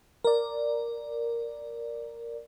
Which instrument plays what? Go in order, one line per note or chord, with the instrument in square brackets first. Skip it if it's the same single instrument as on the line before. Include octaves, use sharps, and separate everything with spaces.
[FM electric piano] A#4 D5